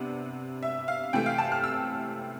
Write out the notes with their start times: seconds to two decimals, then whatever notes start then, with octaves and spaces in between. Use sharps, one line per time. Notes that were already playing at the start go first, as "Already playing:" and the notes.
Already playing: C3 B3 D4
0.63 E5
0.88 F5
1.13 C3 E3 A3 G5
1.26 F5
1.38 A5
1.52 F6
1.64 E6